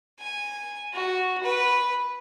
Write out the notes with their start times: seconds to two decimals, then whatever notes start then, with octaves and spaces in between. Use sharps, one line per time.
0.19 G#5
0.93 F#4
1.43 B4